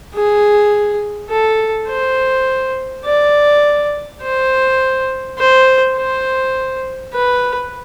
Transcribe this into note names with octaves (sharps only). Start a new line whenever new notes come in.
G#4
A4
C5
D5
C5
C5
C5
B4